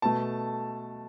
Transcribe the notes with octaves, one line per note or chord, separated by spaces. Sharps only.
B2 A3 A5